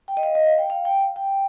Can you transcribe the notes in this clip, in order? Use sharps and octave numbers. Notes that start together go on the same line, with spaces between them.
G5
D#5
F5
D#5
F5
G5
F5
G5
F5
G5